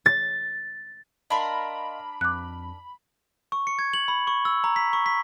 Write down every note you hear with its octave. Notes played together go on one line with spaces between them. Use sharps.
A6
D4 A#4 D#5 F5 B5 C6
F2 D6 F#6
C#6
C#7
G#6
F#7
B5
C#6
E6
A#5
B6
C#6
B6